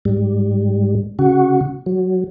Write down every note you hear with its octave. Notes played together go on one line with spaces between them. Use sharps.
G#2 G3
C#3 F#4
F#3